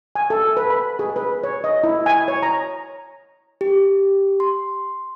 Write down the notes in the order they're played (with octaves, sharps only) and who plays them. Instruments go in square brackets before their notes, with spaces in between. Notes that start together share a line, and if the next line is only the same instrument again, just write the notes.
[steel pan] G#5
A4
B4
B5
G#4
B4
C#5
D#5
E4
G#5
C#5
A#5
[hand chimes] G4
C6